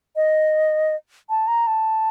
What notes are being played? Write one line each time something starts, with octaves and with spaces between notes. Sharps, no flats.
D#5
A5
A#5
A5